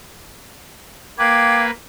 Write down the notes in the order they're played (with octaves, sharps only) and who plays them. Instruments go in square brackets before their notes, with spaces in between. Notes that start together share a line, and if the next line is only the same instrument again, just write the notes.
[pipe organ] A#3 B4 [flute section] F5 G5 G#6 [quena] D6